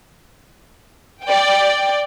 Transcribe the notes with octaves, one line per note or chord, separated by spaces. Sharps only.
D5 G5